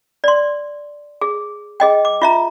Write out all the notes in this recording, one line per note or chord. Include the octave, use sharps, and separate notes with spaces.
D5 C6
G#4
G#4 D#5 G5
D6
F4 E5 A#5